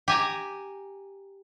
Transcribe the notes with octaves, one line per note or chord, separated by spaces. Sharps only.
G4 G#5 A#5